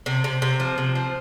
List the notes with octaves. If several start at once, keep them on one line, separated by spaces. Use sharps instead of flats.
C3
C3
C3
F3
C3
F3